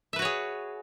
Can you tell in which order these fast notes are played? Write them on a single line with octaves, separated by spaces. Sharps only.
E5 B4 F#4 C#5 G#4